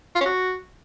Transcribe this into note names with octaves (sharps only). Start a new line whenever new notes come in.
F4
C#4
F#4